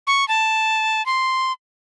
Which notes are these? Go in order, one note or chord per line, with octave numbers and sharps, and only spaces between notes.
C#6
A5
C6